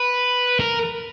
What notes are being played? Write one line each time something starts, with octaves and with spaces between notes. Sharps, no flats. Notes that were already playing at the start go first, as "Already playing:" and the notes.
Already playing: B4
A#4